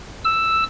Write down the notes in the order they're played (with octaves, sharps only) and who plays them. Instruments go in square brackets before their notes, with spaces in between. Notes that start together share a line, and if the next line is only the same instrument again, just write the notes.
[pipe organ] E6